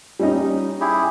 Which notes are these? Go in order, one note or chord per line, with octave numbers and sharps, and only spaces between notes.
G3 C#4 D#4
E4 G4 G#4